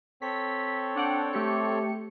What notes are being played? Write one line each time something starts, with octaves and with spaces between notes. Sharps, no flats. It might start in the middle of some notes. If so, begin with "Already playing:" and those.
C4 A4 C#5 B6
D4 F#5 G5
A3 G4 C#7